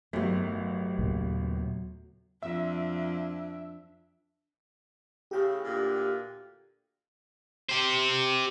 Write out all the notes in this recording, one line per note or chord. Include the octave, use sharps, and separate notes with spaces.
G1 A2 D#3 F#3 A3
D#2 A#2 C#3
F2 D4 E5
A2 C#3 G4 G5
D2 A#2 D3
G4 C5